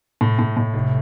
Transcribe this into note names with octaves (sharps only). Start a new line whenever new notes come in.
A2
A2
A2
F1